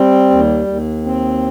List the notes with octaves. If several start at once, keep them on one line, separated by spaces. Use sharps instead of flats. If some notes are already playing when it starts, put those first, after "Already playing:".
Already playing: G3 C4
D#2
D#2
C4